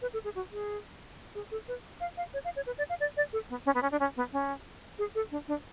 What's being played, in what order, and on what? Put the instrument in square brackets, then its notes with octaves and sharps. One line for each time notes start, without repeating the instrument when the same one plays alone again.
[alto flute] B4
A4
G#4
F#4
G#4
G#4
A4
B4
F5
F5
C#5
F5
C#5
B4
D5
F5
D5
D5
A4
B3
C#4
B3
C#4
D4
C#4
B3
C#4
G#4
A4
D4
D4